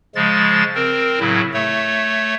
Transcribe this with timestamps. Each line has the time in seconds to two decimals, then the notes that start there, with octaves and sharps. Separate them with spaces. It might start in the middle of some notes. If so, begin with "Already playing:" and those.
0.15 C#3 F3 G#3 A6
0.75 C4 A#4
1.20 A2 C#3 F#3 E4
1.53 A3 C#5